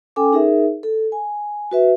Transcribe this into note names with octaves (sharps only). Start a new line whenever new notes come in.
C#4 A4 G5 G#5 D6
D#4 G#4 A#4 E5
A4
G#5
F#4 B4 E5